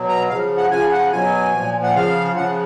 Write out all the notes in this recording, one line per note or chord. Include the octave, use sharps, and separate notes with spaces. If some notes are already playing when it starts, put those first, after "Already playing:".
Already playing: B2 F#3
A#5
C#3 F3 F5
F#5
C#3 F3 G#5
F#5
B2 F#3 G#5
A#2 F3
F#5
C#3 F3 F5
C#3 F3 F#5